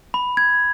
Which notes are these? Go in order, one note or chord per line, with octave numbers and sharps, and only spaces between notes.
B5
G#6